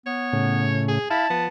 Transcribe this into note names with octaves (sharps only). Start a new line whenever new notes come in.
B3 C#5
A2 C#3
G#4
E4 F5 A5 B5
F3 B3